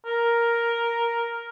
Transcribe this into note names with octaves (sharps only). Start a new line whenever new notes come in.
A#4